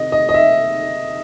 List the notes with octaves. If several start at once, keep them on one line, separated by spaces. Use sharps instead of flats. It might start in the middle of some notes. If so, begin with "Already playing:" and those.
Already playing: C3 D#3 D#5
D#5
D#5
E5